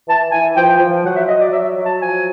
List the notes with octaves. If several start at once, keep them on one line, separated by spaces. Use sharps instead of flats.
E3 A5
E3 G#5
F3 G5
F3
F#3 F#5
E5
F#3 D#5
D5
F#3 E5
F#3
A5
F3 G#5